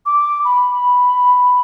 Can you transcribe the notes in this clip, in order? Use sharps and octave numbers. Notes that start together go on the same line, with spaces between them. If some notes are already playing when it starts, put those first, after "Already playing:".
D6
B5